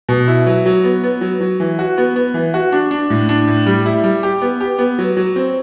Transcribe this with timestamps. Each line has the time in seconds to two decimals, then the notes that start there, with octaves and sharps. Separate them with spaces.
0.09 B2
0.28 E4
0.46 F#3
0.66 F#3
0.84 B3
1.04 B3
1.21 F#3
1.41 F#3
1.60 E3
1.79 F#4
1.98 B3
2.16 B3
2.34 E3
2.54 F#4
2.72 D4
2.91 D4
3.10 A2
3.29 D4
3.47 A2
3.66 G3
3.86 E4
4.04 G3
4.23 G4
4.42 B3
4.61 G4
4.79 B3
4.99 F#3
5.17 F#3
5.36 C4